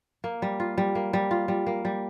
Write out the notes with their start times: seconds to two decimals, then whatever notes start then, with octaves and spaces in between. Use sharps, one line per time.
0.24 A#3
0.42 G3
0.60 F4
0.78 G3
0.95 A#3
1.13 G3
1.31 F4
1.48 G3
1.67 A#3
1.85 G3